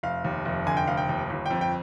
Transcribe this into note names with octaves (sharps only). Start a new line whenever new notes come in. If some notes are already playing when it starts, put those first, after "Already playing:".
F1 F5
D#2
F1
D3 G#5
G5
F1 F5
G5
D#2
G1
F2 G5
G5